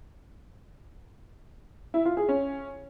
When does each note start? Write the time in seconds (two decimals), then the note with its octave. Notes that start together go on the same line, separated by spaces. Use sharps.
1.94 E4
2.05 F4
2.17 G#4
2.29 C#4